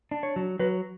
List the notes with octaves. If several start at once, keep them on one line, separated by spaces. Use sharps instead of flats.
D4
C#5
F#3
F#3 B4